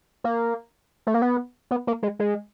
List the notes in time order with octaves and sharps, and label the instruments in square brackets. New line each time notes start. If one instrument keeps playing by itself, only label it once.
[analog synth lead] A#3
A3
A#3
B3
B3
A#3
G#3
G#3